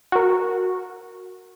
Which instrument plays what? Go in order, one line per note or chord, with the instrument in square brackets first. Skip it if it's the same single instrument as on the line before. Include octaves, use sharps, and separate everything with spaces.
[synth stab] F#4 A#4